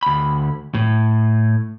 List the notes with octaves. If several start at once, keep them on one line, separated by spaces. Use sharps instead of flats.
D2 B5
A2